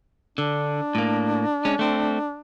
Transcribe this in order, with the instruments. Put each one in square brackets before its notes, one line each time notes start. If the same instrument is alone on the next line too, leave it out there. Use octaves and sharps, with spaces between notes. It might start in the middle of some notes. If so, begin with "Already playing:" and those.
[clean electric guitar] D3 [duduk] D4
[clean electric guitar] A2 A#3
G#3 C#4
A3 C4